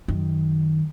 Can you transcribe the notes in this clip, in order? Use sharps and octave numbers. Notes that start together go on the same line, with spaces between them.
F#2 D#3